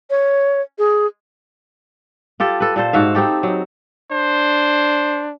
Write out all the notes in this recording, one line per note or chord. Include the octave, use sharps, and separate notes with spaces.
C#5
G#4
F4 G4 A4
A4 B4
A#2 A4 C5
G#2 F#4 E5 F5
C4 D#4 G4 A4
F#3 D#4
D4 C5